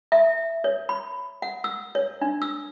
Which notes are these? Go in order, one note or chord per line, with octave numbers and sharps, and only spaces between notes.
E5
C#5
B5
F#5
E6
C#5
D4
E6